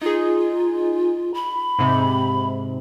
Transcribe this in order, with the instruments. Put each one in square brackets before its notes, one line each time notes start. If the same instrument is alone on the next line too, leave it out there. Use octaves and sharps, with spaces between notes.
[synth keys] D#4 G#4 [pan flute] F4
[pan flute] B5
[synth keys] G#2 C3